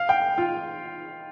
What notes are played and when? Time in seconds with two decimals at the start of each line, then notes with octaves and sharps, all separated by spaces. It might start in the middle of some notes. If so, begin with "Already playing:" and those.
Already playing: F5
0.09 G5
0.38 F4